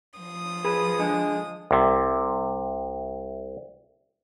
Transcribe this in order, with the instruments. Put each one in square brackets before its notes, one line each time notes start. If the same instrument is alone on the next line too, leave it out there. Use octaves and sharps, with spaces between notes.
[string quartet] F3 D#6
[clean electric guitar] G#4 B4
[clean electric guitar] D3 [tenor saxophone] G#3
[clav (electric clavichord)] C2 C3